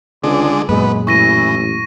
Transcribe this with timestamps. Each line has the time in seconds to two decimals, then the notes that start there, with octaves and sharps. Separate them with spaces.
0.24 C#2 D3 G#3 D5
0.69 F#2 A#2 G#3 B3 B4
1.07 A1 E3 C#6 A#6 D#7